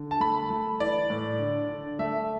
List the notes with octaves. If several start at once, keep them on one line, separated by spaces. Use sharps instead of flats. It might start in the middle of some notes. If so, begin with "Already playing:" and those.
Already playing: D3
A5
A3 B5
A3
E3 D5
A2
D3
D3
A3 E5